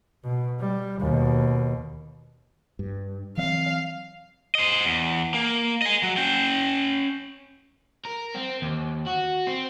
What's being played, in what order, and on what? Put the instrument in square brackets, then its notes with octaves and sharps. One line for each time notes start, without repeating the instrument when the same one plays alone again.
[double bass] B2
G3
D#2 B2
[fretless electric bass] G2
[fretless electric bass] E3 F#3 C4 [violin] F5
[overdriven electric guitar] C5 D#5
E2
A#3
D#5 G#5
F#3
C#4 G5
A#4
C4
D#2
F#4
C4